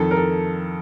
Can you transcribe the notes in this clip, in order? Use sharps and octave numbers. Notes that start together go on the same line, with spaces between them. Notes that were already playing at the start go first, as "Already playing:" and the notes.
Already playing: F2 D#3 A4
A#4
A4